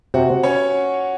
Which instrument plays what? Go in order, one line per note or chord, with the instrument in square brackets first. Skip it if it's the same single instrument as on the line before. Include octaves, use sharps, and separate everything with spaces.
[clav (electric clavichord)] C3 [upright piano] F#4
[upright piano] C#4 C#5